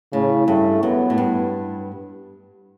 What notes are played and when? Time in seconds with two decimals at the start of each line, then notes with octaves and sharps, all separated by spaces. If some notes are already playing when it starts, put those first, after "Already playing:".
0.13 A2 C#3
0.48 G2 A3
0.82 F#2 B3
1.10 A2
1.18 G2